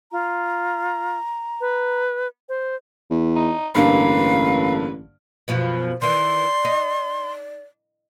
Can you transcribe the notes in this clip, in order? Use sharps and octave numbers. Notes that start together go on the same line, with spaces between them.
F4 A#5
B4
C5
E2
D#4
A1 G2 D3 A#3 B4 F5
F#2 B2 F3
D#3 E3 D5 C6
D#4